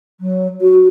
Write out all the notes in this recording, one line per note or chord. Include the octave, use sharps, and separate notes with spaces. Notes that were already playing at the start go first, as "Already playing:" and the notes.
F#3
F#4